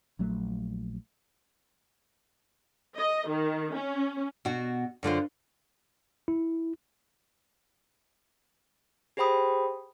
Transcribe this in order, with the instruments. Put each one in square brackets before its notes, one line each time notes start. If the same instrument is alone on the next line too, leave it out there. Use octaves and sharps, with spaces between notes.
[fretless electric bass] A#1 F#3 A3
[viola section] D#5
D#3
C#4
[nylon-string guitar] B2 F#4
F#2 D3 F4 C5
[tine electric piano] E4
[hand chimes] G4 G#4 C5 G5 B5 D#6